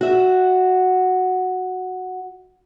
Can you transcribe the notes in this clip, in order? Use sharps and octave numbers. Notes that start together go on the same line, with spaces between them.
F#4 E5